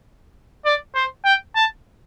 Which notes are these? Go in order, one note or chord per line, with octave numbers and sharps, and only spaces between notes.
D5
C5
G5
A5